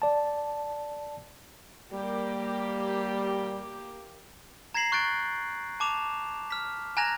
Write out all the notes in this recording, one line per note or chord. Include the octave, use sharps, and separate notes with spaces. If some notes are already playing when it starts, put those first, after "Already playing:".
D5 A5
G3 A#3 G4
A#5 G#6 A#6 C7 F#7
C#6 F#6 G6 A6 D7
A5 D6 E7 F7
F6 B6
G#5 A#5 F#6 G#6 A#6 F7